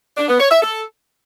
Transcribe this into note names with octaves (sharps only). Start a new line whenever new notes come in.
D4
B3
C#5
E5
A4